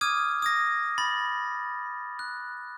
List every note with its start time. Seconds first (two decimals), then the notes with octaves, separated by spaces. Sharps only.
0.01 D6 D#6 F6 G#6 D#7
0.42 D#6 G#6 A#6
0.98 B5 A6
2.19 F#6